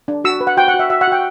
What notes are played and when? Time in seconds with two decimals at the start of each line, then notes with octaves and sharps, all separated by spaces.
0.08 D4
0.24 F#4 E6
0.41 B4
0.47 F#5
0.57 F#4 G5
0.68 F#5
0.74 F#4
0.79 E5
0.90 F#4 E5
1.01 F#5
1.07 F#4 G5